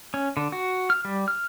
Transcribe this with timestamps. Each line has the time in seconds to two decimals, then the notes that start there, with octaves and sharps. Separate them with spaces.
0.14 C#4
0.37 D3
0.52 F#4
0.90 F6
1.05 G3
1.28 F6